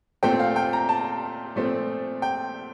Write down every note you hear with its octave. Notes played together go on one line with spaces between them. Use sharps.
A#2 A3 C4 G5
F5
G5
A#5
A5
A#2 F3 A3 C4
G5